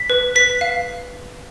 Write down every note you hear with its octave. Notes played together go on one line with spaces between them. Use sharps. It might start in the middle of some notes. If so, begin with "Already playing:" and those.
Already playing: B6
B4
B4 B6
F5